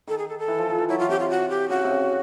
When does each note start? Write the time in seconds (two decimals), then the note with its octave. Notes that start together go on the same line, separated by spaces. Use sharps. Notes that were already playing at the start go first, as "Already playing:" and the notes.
0.08 D#3 A4
0.18 G#4
0.29 A4
0.39 A4
0.48 E3
0.58 F3
0.69 D#3
0.78 E3
0.89 F#3 E4
0.99 F4
1.09 C3 G4
1.20 F4
1.30 F#4
1.50 G4
1.70 C#3 F#4
1.84 C3
1.91 C#3